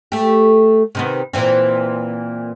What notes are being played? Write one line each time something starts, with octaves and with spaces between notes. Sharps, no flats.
A3 G4
C3 D#3 B3
A#2 E3 C4